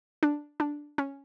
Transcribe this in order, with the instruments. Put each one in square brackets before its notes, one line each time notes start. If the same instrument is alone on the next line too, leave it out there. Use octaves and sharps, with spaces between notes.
[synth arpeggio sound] D4
D4
C#4